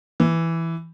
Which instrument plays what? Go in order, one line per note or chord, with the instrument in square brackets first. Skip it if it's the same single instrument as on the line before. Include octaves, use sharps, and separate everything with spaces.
[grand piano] E3